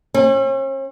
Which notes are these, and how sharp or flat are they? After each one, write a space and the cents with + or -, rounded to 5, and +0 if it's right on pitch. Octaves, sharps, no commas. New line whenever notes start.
C#4 -45